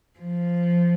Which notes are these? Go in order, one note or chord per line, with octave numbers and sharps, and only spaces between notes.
F3